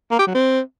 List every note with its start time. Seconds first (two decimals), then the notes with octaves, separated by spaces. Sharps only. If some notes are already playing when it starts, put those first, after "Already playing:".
0.11 A#3
0.19 G4
0.27 F#3
0.35 C4